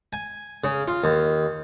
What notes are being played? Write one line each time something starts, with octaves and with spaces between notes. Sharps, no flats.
G#5
C#3
F4
D#2